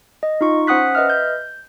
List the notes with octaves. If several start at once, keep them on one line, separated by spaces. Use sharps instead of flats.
D#5
D#4 F4 C#6
C#4 C5 F#5 D#6 F#6 B6
B4 D#5 E5 F6
G6